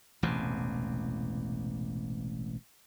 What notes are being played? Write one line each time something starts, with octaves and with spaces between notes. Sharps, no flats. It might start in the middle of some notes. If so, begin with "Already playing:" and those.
E1 A1 E2 C3